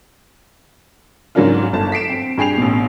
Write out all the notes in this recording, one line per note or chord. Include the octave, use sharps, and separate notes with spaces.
G#2 C#3 F#3 A#3 D4 F4
G1 A5
B6 C7 D7 E7
C4
G2 G#4 G5 C7 F7
A1 B2